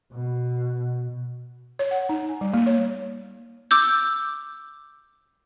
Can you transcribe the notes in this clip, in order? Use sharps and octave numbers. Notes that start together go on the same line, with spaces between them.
B2
C#5
F#5
D#4
G#5
G3
A#3
C#5
D6 E6 G6